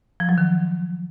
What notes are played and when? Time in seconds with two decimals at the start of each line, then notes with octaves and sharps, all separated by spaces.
0.20 F3
0.29 F#3
0.38 D#3